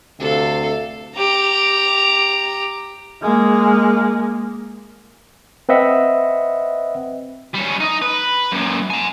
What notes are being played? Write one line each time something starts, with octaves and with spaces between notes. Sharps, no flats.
D2 C3 A4 F5
G4 A#5
G#3 A#3
C4 B4 D#5 E5 F#5
G3 C#4
D#4 D#5
B4
F#2 A#2
G#5 A#5